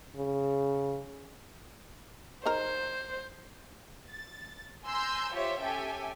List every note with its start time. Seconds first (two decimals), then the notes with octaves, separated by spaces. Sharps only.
0.16 C#3
2.46 D#4 G#4 A#4 C5
4.07 A6
4.86 G#5 A#5 C6 E6 G6
5.33 F4 G4 C5 C#5 E5
5.62 C#4 G4 A4 E5 G5 G#5